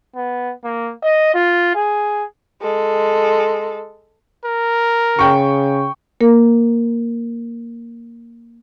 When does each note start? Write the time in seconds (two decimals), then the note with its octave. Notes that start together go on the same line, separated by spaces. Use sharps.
0.16 B3
0.64 A#3
1.03 D#5
1.34 F4
1.76 G#4
2.62 G#3 A4
4.45 A#4
5.19 C#3 G5 C#6
6.21 A#3 A#4